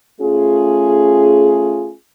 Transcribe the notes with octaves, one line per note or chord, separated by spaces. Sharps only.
A3 C#4 F4 G#4